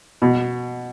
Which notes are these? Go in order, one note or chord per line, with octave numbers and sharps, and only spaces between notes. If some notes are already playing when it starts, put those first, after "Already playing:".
B2